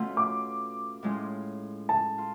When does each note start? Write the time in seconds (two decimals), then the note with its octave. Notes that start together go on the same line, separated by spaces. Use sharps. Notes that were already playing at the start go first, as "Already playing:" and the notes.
Already playing: B2 A3 C#4 F4
0.17 D6
1.03 A2 G#3 C#4 F4
1.89 A5
2.18 F4